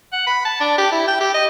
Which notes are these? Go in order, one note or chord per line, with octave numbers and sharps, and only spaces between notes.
F#5
B5
A5
D4
G4
E4
G5
G4
D#5